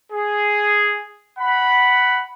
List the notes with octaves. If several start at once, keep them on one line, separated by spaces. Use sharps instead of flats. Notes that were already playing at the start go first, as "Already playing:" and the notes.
G#4
F#5 B5